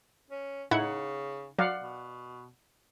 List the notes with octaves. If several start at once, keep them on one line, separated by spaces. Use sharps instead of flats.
C#4
A2 C#3 D#4 E4 F#5 G#6
F#3 D5 F5 F#5
B2